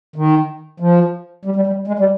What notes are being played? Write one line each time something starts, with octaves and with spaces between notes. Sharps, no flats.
D#3
F3
G3
G3
G3
G#3
G3